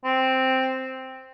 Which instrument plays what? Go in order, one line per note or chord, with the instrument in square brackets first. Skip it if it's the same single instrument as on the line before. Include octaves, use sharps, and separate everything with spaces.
[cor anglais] C4